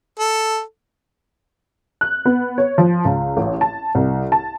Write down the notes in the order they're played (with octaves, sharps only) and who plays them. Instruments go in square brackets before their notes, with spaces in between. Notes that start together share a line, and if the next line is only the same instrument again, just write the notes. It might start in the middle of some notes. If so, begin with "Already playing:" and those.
[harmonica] A4
[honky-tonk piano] F#6
B3
C#5
F3
C#2
A1
A5
C2
A5